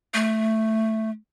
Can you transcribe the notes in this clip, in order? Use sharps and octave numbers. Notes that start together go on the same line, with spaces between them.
A3